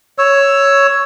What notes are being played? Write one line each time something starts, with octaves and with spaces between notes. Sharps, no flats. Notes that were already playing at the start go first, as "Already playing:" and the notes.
C#5 E6